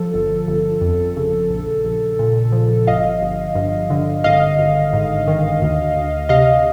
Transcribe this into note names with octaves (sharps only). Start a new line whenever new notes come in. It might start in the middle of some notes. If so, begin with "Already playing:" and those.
Already playing: F3 A4
G1
G1
F2
C#3
A#1
A#1
A#2
F3
G1 D#5 F5
G1
G2
D3
G#1 D#5 F5
G#1
G#2
D#3
D2
D2
C3 D#5 F5